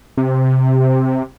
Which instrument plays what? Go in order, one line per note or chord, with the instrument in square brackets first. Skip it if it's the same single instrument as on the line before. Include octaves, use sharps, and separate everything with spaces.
[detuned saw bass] C3